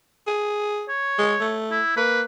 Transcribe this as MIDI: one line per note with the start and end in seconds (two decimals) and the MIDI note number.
0.27 0.88 68
0.88 1.57 73
1.18 1.35 56
1.40 1.80 57
1.71 1.94 64
1.97 2.23 58
1.97 2.21 71